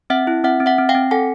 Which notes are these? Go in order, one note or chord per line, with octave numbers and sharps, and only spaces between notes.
C4 E5 F#5
E4
C4 E5 F#5
C4
E5 F#5
C4
F5 G5
C4
A4 F#5 G#5